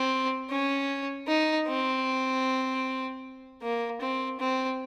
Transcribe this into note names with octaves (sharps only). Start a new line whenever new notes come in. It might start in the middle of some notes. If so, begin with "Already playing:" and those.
Already playing: C4
C#4
D#4
C4
A#3
C4
C4